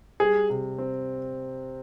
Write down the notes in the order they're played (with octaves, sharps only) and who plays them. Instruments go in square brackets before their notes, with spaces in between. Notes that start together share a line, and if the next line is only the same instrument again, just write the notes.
[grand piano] G3 [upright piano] G#4
[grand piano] C3
C4